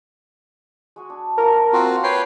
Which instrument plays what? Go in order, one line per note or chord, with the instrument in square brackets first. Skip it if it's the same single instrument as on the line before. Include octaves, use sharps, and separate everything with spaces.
[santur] G#3 F#4 G#5
D4
[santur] F3 A#3 A4 [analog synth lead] A#4
[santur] A#3 [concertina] C4 F4 F#4
[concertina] B4 C#5 G5 [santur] D6 [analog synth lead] C7